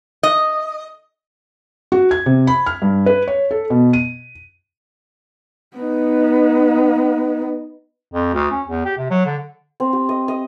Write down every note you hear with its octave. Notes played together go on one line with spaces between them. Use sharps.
D#5
F#4
G#6
C3
B5
F6
G2
B4
C#5
A4
B2
D#7
B3 D#4
F2
D2
C#4
E2
G4
C3
F#3
D3
C4
G4
D#5
D#5